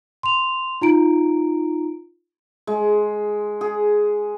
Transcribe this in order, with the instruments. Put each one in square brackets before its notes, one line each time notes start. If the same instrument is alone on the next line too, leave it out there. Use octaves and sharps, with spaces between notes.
[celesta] C6 F7
D#4 F4 A#5 D7
[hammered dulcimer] G#3
G#4